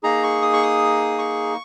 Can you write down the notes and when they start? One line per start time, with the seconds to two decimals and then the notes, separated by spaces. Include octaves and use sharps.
0.03 A#3 D#4 G#4 A#5
0.23 C#6
0.42 D#6
0.53 C#6
0.63 D#6
1.18 C#6